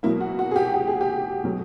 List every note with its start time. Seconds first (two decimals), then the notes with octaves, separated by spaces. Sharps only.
0.03 B2 F#3 A#3 E4
0.21 F#4
0.39 F#4
0.51 G#4
0.56 G4
0.74 G4
0.88 G#4
1.01 G4
1.44 B2 F#3 A3